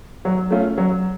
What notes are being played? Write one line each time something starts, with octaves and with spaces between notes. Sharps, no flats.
F#3
A3 C#4 F4
F#3